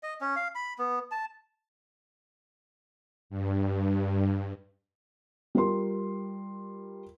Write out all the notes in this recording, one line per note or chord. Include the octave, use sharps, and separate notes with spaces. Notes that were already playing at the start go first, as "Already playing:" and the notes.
D#5
C#4
F5
B5
B3
A5
G2
G3 F4 A#4 C6